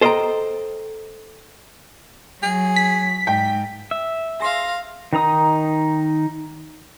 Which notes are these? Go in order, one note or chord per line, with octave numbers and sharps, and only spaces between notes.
A4 C5 D#5 E5 G5 A#5
F#3 G#4
B6
G#2 G5
E5
G#4 F5 C6 A#6
D#3 D#4 A#5 D#6